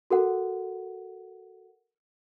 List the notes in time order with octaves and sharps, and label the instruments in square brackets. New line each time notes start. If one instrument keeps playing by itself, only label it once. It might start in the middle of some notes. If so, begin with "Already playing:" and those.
[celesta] F#4 A4 A#4 F#5